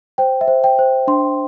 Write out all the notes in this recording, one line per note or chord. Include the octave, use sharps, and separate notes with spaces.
C5 G5
E5
C5
G5
C5
D4 C6